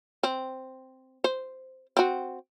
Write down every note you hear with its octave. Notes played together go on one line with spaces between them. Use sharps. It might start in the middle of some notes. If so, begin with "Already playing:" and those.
C4
C5
C4 F#4